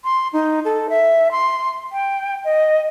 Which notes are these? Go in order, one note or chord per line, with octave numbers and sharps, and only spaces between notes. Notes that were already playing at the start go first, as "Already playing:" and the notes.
C6
D#4
A4
E5
C6
G5
D#5